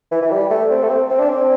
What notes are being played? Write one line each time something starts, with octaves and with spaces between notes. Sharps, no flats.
E3
E3
G3
A3
C4
A3
C4
C4
D4
C4